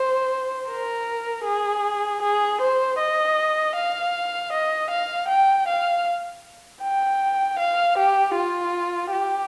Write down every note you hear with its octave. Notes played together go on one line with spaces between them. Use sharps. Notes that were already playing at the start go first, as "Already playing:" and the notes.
Already playing: C5
A#4
G#4
G#4
C5
D#5
F5
D#5
F5
G5
F5
G5
F5
G4
F4
G4